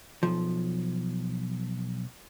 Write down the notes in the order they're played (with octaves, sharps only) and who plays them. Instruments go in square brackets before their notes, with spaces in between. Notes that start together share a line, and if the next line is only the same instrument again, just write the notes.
[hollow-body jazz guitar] B1 F3